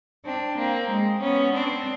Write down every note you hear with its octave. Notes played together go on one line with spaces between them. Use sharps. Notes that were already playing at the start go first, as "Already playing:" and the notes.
C4 D4
A#3 C4
G#3
B3 C#4
C4 D4